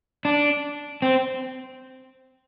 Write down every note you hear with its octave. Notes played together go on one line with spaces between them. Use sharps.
D4
C4